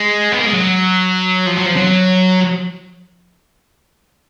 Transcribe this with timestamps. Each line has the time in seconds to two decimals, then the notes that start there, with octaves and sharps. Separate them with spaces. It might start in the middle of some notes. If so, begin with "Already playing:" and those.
Already playing: G#3
0.32 B3
0.38 A#3
0.46 G#3
0.53 F#3
1.47 F3
1.57 F#3
1.66 F3
1.77 F#3